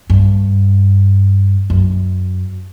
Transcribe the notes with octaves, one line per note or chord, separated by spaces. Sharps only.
G2
F#2